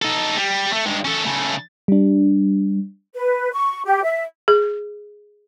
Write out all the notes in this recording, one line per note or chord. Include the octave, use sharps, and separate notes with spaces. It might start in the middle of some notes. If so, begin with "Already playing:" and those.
D#4 A4
G3
A3
G2 G#3
C#4 A4
C#3 A3
G3 D4
B4
C#6
G4
E5
G#4